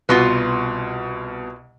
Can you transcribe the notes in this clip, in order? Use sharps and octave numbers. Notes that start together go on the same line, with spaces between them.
C2 B2 F4 F#4 B4 C6